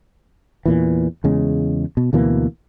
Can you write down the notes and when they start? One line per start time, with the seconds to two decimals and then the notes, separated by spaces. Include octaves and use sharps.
0.66 E2 A#2 E3
1.24 E2 C#3 G#3
1.97 B2
2.13 D2 B2 E3 A#3